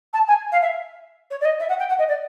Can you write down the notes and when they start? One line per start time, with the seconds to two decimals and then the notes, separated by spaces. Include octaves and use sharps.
0.13 A5
0.28 G#5
0.52 F5
0.62 E5
1.30 C#5
1.41 D5
1.45 D#5
1.60 E5
1.69 F#5
1.79 G5
1.89 F#5
1.99 D#5
2.08 D5